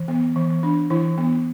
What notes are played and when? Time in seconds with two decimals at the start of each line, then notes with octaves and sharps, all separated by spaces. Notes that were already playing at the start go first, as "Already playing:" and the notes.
Already playing: E3
0.08 B3
0.36 E3
0.63 D4
0.90 E3 E4
1.18 B3